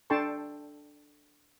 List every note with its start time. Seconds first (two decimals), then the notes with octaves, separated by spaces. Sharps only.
0.10 D4 A4 G5 A5 C6 C#6